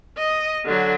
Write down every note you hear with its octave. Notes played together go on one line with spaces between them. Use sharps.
D#5
D3 F#3